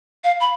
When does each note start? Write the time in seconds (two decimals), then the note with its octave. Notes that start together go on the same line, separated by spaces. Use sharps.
0.24 F5
0.41 B5